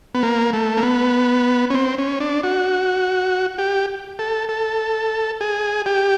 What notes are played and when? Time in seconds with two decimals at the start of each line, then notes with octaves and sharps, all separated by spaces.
0.15 B3
0.23 A#3
0.53 A3
0.77 A#3
0.83 B3
1.70 C#4
1.74 C4
1.98 C#4
2.20 D4
2.44 F#4
3.58 G4
4.19 A4
4.49 A4
5.41 G#4
5.86 G4